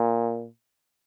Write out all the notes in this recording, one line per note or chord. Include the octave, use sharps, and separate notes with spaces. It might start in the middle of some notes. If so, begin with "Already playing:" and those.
Already playing: A#2